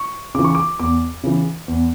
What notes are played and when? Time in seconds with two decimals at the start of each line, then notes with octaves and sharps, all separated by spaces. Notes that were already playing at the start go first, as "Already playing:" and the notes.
Already playing: C#6
0.35 C#3 E3 D6
0.45 C#6
0.55 D6
0.79 E2 D6
1.24 C#3 E3
1.68 E2